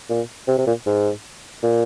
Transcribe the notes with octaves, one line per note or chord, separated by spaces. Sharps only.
A#2
C3
C3
A#2
G#2
A#2